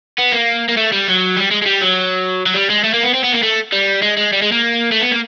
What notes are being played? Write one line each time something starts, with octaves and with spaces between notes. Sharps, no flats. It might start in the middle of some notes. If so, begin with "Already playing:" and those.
B3
A#3
A#3
A3
G3
F#3
G3
G#3
G#3
G3
F#3
F#3
G3
G#3
A3
A#3
B3
C4
B3
A#3
A3
G3
G#3
G#3
G3
G#3
A#3
A3
B3
A#3